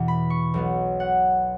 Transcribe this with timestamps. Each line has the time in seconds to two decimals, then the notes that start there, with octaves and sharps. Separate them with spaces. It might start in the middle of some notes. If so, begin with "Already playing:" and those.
Already playing: E2 B2 E3 B3
0.08 B5
0.30 C#6
0.54 B1 B2 F#3 B3
1.00 F#5